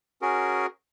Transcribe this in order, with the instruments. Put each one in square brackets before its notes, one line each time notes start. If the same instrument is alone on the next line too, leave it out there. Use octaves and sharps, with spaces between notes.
[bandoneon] C#4 F#4 G#4 A#4